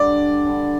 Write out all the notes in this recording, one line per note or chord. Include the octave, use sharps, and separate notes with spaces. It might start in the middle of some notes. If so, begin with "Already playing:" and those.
Already playing: D3 G3 D4 D5
D3 G3 D4